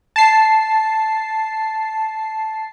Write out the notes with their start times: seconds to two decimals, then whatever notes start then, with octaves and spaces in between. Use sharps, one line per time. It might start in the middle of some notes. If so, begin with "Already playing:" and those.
0.16 A5 C7